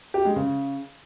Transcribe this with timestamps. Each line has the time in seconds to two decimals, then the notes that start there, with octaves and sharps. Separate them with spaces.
0.14 G4
0.25 G#3
0.36 C#3